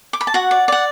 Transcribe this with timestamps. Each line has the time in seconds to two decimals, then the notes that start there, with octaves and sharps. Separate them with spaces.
0.13 D6
0.21 B5
0.27 A5
0.34 F#4 F#5
0.51 D5
0.68 D5 F#5